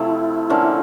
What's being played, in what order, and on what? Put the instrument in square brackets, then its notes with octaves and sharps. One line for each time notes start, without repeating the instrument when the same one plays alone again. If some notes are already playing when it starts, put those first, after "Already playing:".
Already playing: [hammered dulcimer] C3 F3 A3 [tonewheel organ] E4
[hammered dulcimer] D3 F3 A#3 C#4